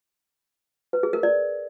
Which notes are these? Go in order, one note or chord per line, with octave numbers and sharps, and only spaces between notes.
B4
G#4
A#4
D5